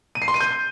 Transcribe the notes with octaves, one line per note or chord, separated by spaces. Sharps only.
D#7
C7
C6
D#7
G6